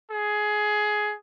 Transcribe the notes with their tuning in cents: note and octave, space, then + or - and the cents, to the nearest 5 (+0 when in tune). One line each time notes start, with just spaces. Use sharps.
G#4 +15